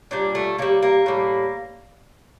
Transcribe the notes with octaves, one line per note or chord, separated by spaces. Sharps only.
A#2 G3 D4
A3
D3 G3 A#3
A#3
A2 G3